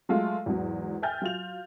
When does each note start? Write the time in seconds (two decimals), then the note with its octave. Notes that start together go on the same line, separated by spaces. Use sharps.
0.09 F#3 G#3 A3 F4
0.46 E2 G#2 F#3
1.02 E5 G5 G#5 F6 G6 A6
1.22 F#3 F4 F7